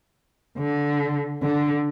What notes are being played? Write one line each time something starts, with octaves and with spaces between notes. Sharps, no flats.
D3
D3